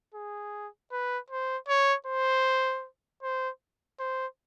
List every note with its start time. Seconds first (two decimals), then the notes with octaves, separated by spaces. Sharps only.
0.15 G#4
0.92 B4
1.30 C5
1.68 C#5
2.07 C5
3.23 C5
4.00 C5